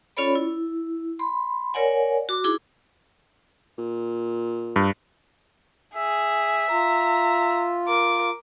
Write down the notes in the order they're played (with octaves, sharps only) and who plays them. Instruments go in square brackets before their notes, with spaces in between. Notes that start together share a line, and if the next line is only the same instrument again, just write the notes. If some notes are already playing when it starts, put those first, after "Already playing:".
[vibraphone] C#4 F4 A4 C#5 D5 B5
E4
B5 C6
A#4 C#5 D5 F#5 G#5
F#4 D6
D#4 E4 G#4 D6
[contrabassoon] A#2
[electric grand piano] G2
[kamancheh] G#4 [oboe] E5
[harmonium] F4 [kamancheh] A#5
[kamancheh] A#4 D6